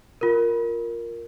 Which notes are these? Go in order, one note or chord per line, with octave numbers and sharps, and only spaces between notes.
F4 A#4